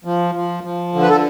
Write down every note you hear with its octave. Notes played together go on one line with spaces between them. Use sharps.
F3
F3
F3
D3
B4
A4